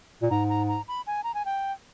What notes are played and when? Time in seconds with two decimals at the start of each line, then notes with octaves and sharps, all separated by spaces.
0.22 A#2
0.30 G#2 A#5
0.49 A#5
0.68 A#5
0.88 B5
1.07 G#5
1.24 A#5
1.34 G#5
1.45 G5